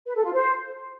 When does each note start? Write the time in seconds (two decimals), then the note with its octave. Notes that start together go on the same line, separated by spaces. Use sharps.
0.06 B4
0.15 A4
0.24 F4
0.33 C5